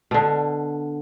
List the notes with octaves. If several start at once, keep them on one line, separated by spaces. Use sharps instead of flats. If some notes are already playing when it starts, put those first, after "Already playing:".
B2 D3